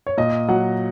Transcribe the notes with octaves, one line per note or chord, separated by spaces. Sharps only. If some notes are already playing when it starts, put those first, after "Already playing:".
C#5
A#2 D#5
F#3 F#5